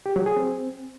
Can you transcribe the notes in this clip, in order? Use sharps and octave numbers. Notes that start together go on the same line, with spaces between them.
G4
F#3
G#4
C4